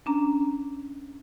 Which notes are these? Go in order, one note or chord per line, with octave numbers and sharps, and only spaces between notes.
C#4 D4 A#5